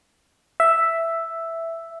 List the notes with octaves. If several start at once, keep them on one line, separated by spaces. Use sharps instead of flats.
E5